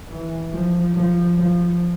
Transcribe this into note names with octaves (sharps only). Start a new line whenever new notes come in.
E3
F3
F3
F3